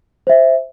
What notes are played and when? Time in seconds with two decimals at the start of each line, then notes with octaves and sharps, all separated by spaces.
0.27 C5 E5